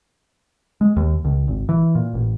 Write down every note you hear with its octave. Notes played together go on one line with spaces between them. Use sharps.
G#3
D#2
C#2
G#1
E3
A#2
A1